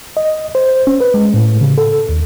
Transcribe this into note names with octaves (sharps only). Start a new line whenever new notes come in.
D#5
C5
C#4
B4
G#3
A2
C#3
A4
D#2